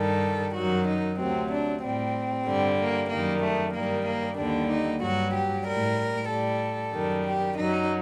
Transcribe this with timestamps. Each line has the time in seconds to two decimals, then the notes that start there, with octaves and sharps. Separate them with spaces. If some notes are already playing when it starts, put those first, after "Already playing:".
Already playing: G2 D#3 G3 A4
0.55 F#2 D#3 F#3 F#4
0.87 D#4
1.18 D2 C3 F#3 C4
1.50 D4
1.82 A2 G3 C4
2.46 G2 D3 G3
2.78 A#3
3.10 F#2 D#3 G3 A#3
3.42 A3
3.74 G2 D#3 G3 A#3
4.06 A#3
4.38 D#2 D3 G3 D4
4.70 D#4
5.02 G2 F#3 F#4
5.34 G4
5.65 A2 G3 A#4
6.29 A2 G3 A4
6.93 F#2 D#3 G3
7.25 G4
7.57 F#2 F#3 D#4